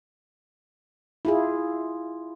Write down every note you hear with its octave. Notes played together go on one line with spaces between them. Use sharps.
E4 F4 G#4